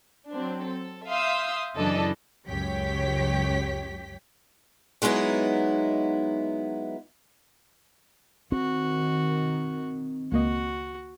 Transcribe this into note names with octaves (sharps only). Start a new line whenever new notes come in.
F#3 C4 D4
A4
E5 F5 C6 D#6 E6 G6
F#2 C#3 E3 D4 A4 D#5
C#2 F#2 G4 C#5 G5 B6
F#3 G#3 B3 D#4 E4
D#3 C4 F#4
C#2 A#3 F#4 D#5